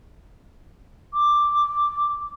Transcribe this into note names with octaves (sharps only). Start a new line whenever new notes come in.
D6